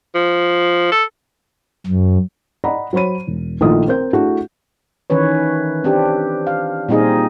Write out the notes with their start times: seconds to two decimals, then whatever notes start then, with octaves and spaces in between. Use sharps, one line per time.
0.15 F3
0.92 A4
1.86 F#2
2.64 D5 D#5 F#5 A#5 B5
2.93 F#3 C5 C#5 B5 D#7
3.27 E1
3.61 A#1 D#3 A3 E4 F4 D#6
3.88 C4 A#4 C5 G6
4.13 A3 D4 E4 F#4 G#4
5.10 D#3 E3 C#4 B4 C#5
5.84 C4 D4 G4
6.47 F5
6.89 A#2 G3 C4 D#4 G#4 D#5